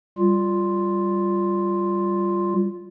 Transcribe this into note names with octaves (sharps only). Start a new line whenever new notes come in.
G3 F4